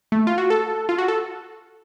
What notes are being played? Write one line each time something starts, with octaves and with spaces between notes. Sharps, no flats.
A3
F4
F#4
A4
F4
F#4
A4